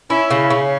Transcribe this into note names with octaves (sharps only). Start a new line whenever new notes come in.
C#4 E4
C#3
C#3